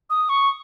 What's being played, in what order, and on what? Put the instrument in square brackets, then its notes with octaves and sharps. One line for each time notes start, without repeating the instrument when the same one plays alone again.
[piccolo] D#6
C#6